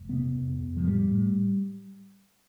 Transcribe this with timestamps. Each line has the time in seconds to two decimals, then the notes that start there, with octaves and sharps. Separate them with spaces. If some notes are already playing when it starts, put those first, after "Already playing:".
Already playing: F1
0.09 C3 B3
0.34 F2
0.59 F2
0.77 F3
0.83 A2 G3
1.09 A2